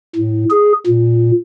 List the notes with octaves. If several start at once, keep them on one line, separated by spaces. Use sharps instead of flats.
A2
G#4
A#2